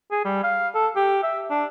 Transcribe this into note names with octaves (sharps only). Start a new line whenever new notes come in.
G#4
G3
F5
A4
G4
E5
D4